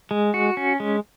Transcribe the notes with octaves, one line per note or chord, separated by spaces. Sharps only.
G#3
F#4
C#4
G#3